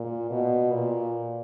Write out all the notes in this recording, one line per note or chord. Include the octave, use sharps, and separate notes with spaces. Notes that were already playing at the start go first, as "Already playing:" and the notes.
Already playing: A#2
B2
A#2